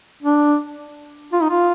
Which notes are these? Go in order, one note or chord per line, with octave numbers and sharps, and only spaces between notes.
D4
F4
D#4
F4